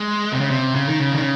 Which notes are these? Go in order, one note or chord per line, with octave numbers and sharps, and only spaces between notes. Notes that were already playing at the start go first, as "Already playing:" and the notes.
Already playing: G#3
C3
C#3
C3
C#3
D#3
C#3
D#3
C#3